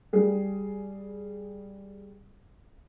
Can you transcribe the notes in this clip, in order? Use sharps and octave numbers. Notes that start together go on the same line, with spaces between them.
G3 G#4